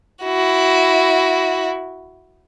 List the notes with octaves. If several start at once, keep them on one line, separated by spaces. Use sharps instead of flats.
E4 F#4